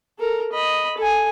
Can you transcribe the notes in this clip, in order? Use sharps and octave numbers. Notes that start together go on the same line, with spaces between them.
A4 A#4
D#5 B5
A4 G#5